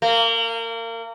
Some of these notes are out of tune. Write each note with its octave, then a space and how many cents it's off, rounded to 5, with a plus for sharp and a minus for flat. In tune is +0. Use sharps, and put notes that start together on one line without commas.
A#3 -30